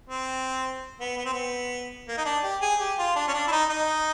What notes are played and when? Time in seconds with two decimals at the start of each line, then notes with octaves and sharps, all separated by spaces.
0.10 C4
1.00 B3
1.17 B3
1.25 C4
1.33 B3
2.08 A#3
2.17 D#4
2.26 D4
2.43 G4
2.61 G#4
2.80 G4
2.98 F4
3.16 D4
3.28 C#4
3.34 D4
3.47 E4
3.51 D#4
3.69 D#4